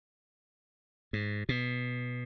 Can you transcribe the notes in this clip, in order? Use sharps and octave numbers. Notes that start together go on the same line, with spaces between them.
G#2
B2